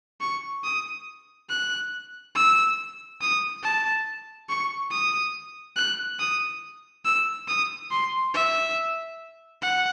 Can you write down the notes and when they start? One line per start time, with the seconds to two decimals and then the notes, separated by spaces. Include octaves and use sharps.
0.21 C#6
0.64 D#6
1.50 F#6
2.35 E6
3.21 D#6
3.63 A5
4.49 C#6
4.92 D#6
5.77 F#6
6.20 D#6
7.05 E6
7.48 D#6
7.91 C6
8.35 E5
9.62 F#5